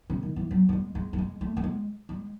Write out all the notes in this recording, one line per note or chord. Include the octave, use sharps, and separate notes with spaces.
C#3
D#3
E3
F#3
F#3
G#3
G#3
A3
G#3
A3
A3
G#3
G#3